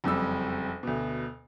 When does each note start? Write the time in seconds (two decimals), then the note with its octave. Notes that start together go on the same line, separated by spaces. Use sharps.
0.04 F#1 F2 G3 E6
0.83 D2 B2